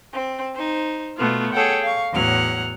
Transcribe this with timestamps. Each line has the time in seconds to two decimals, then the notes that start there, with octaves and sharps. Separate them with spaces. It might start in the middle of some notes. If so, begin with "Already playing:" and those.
0.12 C4
0.54 D#4 C5
1.17 B2 A3 B3 F4
1.53 G#4 A4 C#5 F#5 G5
1.82 F5 C#6
2.11 E2 A2 F#3 F#5 F6